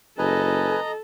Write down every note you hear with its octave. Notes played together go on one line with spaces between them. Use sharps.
F#1 A4 B4 D#5 G#5 A#5